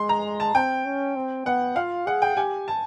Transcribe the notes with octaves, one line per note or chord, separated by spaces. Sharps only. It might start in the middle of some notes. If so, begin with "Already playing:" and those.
Already playing: G#3 C6
A#5
A5
C4 G5
C#4
C4
B3 F#5
F4 F5
G#4 F#5
G5
G4 G#5
A5